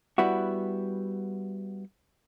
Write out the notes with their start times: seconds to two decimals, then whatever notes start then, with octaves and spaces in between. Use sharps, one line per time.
0.18 G3 B3 E4 F#4